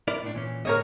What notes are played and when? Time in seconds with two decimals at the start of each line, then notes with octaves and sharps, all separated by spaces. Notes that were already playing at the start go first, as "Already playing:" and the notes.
0.08 E4 A#4 D5
0.23 A2 D4
0.35 A#2 E3 C#4
0.65 A2 D3 A#4 C#5 D#5